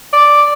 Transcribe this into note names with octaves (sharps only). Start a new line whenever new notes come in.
D5